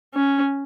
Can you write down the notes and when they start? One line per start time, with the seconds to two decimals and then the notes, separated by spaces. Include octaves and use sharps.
0.14 C#4